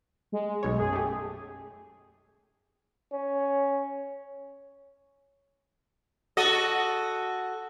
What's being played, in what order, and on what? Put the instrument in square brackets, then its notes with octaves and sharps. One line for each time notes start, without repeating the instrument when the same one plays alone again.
[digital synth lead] G#3
[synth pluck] B1 C#5
[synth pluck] F#2 [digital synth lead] G#4
[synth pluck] A3 G4
[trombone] C#4
[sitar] F#4 A4 D#5